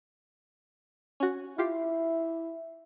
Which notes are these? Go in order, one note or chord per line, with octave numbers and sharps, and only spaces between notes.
C#4 F#4
E4 F4 G4 C7